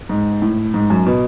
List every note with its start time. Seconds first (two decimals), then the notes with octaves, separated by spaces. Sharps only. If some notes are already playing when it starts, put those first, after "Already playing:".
0.09 G#2
0.42 A2
0.74 G#2
0.90 F#2
1.06 B2